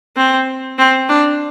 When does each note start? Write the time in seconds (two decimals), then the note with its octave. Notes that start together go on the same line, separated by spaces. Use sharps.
0.17 C4
0.78 C4
1.09 D4